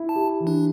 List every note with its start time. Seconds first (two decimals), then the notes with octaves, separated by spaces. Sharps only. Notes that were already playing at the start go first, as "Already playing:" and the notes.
Already playing: E4
0.09 A5
0.16 G4
0.40 E3
0.47 D4